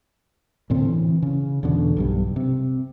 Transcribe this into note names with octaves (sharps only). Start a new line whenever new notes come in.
D2 A2 D3 C4
E3
C#3
E2 B2 D3
B1 G2 G3
C3